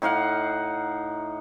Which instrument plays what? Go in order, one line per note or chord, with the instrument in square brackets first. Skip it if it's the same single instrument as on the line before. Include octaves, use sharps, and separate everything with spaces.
[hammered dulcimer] A2 D#4 F5 F#5